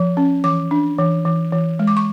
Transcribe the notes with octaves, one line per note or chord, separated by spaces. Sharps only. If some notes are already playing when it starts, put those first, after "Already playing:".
Already playing: F3
C#4
E3 D6
D4
E3
E3
E3
G#3
D6
C#6